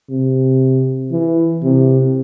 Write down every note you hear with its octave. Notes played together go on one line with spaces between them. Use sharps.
C3
E3
C3